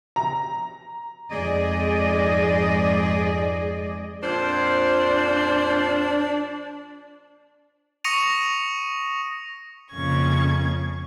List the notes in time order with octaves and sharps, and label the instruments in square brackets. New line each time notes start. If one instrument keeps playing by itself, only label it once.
[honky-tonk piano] A#5
[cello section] F2 G#2 G#4 D5 D#5
[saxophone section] F2 A#2 C5 [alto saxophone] D4
[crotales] C#6 D#6 A#6 C#7 D#7 F7
[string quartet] F2 C#3 A#3 C#4 C#6 G#6